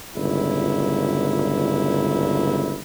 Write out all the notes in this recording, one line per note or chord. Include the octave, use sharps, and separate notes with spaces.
G1 C#2 A#2 E4